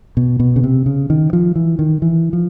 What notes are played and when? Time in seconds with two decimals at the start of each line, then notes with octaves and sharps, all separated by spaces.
0.17 B2
0.40 B2
0.56 C#3
0.64 C3
0.86 C#3
1.10 D#3
1.33 F3
1.56 E3
1.79 D#3
2.02 E3
2.33 F3